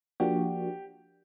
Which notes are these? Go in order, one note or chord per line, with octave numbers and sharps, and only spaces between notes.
F3 A#3 D4 F#4 G4